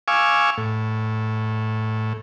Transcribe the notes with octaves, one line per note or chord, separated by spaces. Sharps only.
F5 G#5 C#6 D6 E6
A2